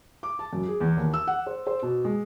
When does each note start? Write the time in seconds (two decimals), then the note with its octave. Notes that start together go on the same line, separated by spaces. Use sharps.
0.23 D6
0.39 A5
0.53 F#2
0.68 G#4
0.81 E2
0.97 D#2
1.14 E6
1.27 F#5
1.46 C5
1.67 C5
1.82 B2
2.04 G#3